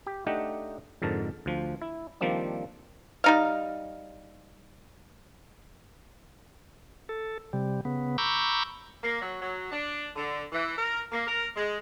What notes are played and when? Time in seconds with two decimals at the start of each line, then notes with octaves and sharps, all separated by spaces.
0.07 G4
0.27 A3 D4 D#4 G4 D#5 F#5
1.02 F2 G#2 D3 A#4 A5
1.46 D2 F3
1.82 E4
2.21 D#3 F3 G3 A#3 C4 D4
3.24 G3 D#4 F5
7.09 A4
7.53 C3 G3
7.85 C#3 B3
8.18 A#5 B5 C#6 D6 E6 G6
9.02 A#3
9.20 F#3
9.41 F#3
9.71 D4
10.15 D3
10.52 E3
10.76 A#4
11.11 A#3
11.26 A#4
11.55 G#3